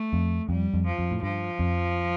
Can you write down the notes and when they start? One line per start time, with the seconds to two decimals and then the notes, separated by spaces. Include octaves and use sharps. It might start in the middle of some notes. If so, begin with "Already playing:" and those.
Already playing: A3
0.13 F2
0.49 F2 G3
0.74 F2
0.86 F3
0.99 F2
1.11 A2
1.23 G2 F3
1.59 F2